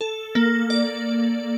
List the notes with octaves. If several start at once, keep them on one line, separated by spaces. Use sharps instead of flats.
A4
A#3
D5